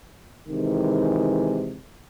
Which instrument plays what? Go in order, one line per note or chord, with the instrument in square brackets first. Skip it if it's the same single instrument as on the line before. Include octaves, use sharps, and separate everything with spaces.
[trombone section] C3 D#3 E3 G#3